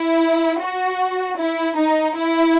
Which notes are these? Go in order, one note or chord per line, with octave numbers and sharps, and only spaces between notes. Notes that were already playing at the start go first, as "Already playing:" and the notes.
Already playing: E4
F#4
E4
D#4
E4